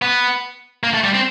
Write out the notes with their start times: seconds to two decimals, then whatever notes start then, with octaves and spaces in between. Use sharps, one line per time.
0.02 B3
0.83 A#3
0.94 A3
1.04 G3
1.14 C4